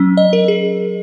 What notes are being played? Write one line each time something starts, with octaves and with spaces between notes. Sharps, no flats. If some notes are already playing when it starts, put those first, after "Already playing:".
Already playing: F#3 C#4
D#5
A#4
G#4